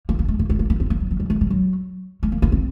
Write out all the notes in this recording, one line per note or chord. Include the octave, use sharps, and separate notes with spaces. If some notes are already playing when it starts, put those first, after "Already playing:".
A#3
A#3
A3
A#3
A3
A#3
A#3
C4
A#3
F#3
F#3
G3
A3
G3
F#3
A3
A#3
A#3
C4